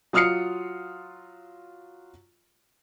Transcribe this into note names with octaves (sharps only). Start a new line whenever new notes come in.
F#3 F4 D#6 F6 C7 C#7